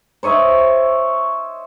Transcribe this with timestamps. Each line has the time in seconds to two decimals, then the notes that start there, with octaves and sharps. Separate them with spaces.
0.23 C5 C#5 D#5 E5